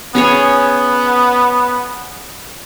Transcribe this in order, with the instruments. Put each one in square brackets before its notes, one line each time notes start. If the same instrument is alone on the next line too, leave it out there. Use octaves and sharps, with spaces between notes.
[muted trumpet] B3 [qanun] C#4 G#4 C#5